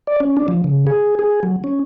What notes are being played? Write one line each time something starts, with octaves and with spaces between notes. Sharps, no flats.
D5
C#4
D4
F3
C#3
G#4
G#4
F#3
C#4